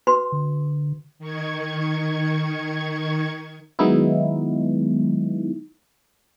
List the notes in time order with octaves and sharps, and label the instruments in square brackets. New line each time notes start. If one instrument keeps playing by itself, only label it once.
[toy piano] F#4 B4 C6
[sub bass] D3
[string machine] D#3 C#6 G#6
[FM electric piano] D#3 F#3 G#3 B3 D#4 E4